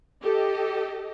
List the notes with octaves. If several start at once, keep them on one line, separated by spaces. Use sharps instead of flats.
G4 A4 D#5